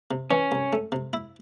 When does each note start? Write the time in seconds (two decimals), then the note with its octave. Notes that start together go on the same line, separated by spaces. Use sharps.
0.11 C3
0.30 E3 C#4
0.52 C2
0.73 A3
0.92 C3
1.13 E4